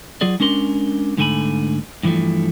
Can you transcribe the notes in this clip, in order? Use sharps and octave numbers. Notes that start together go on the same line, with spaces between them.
F#3 F4 G#4 D5
G#3 C#4 D4 A#4 C6
G#2 D3 A3 E4 G#5 B5
G2 E3 F3 A3